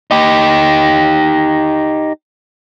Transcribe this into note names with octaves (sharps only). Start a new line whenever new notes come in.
D#4 G4